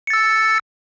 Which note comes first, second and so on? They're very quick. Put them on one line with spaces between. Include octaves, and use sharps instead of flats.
C#7 A6 E6